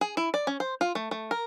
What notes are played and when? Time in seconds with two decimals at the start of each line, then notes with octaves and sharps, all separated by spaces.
0.01 G#4
0.17 E4
0.34 D5
0.47 C#4
0.60 C5
0.81 F4
0.95 A3
1.11 A3
1.31 A#4